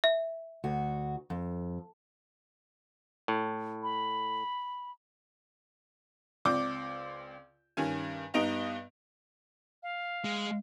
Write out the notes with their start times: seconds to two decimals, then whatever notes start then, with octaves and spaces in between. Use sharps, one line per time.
0.04 E5
0.64 D2 F#4
1.30 F2
3.28 A2
3.83 B5
6.45 C#2 C4 D5 D6 G6
7.77 G2 D#3 C#4 G#5
8.34 G2 B3 D#4 D#5 D7 F7
9.83 F5
10.24 G#3